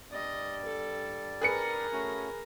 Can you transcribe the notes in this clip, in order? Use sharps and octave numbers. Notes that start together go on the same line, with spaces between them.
G2 G3 D5 D#5
A4
G#4 A#4 B4 A#5 C#7
A3 C#4 F#4